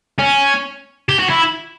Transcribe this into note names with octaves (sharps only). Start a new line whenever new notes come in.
C#4
G4
F#4
E4